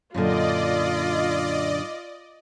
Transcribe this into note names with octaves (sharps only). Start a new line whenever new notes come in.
F#2 A#2 D3 F4 D5 D#5